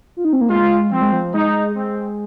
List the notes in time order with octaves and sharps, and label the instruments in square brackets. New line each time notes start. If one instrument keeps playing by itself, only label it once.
[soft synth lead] F4
D#4
C4
A#3
[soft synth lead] G#3 [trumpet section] F4
[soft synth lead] F3 [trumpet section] C4
[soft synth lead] G#3
F3
[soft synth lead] G#3 [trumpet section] D#4
[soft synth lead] G#3 [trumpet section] C4